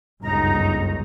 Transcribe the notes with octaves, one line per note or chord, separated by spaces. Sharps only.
G1 C#2 F#2 D#4 A#5